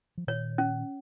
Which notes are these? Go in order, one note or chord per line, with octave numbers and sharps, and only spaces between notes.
F3
A#2 D#3 C#5
C#4